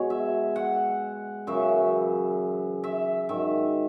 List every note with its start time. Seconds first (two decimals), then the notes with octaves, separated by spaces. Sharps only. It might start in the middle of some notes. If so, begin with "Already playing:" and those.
Already playing: B2 G#3 C#5
0.10 E5
0.56 F#5
1.47 F#2 C#3 E3 E5
2.84 E5
3.29 G#2 D#3 F#3 E5